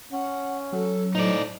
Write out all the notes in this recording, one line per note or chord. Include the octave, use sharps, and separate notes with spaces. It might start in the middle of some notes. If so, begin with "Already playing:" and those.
C#4 F#5
F#3 A4
A2 D#4 C5 D5